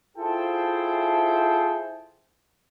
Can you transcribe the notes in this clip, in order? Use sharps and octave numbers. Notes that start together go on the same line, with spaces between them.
E4 F4 G#4 A4 C5 G5